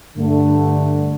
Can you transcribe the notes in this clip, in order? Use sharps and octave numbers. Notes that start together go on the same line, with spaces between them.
G2 D3 A3